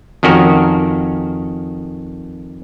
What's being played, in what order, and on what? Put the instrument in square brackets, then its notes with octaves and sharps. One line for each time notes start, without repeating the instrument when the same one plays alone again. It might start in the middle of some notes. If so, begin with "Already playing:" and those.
[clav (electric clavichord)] F2 D#3 C#4 F#4 A#4